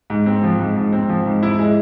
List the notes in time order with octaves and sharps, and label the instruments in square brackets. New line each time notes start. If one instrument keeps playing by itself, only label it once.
[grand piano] G#2
C4
F3
G#2
G#2
C4
F3
G#2
E4
G#3